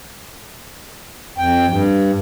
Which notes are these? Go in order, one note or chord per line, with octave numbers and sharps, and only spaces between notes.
F2 G5
G2